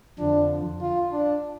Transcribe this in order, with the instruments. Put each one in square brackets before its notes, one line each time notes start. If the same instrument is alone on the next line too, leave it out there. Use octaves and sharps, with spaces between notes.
[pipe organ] F2 D3 F3 [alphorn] D4
[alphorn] F4
D4